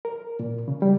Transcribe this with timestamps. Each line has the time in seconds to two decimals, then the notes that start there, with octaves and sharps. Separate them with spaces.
0.05 A#4
0.40 A#2
0.68 C#3
0.82 G3